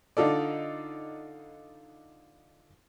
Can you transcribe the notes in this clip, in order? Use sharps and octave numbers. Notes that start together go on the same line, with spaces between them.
D3 D#4 F4 A4 D5